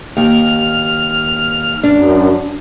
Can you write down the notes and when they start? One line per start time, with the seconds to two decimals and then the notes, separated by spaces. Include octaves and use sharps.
0.17 D#2 F6
1.84 F#2 D4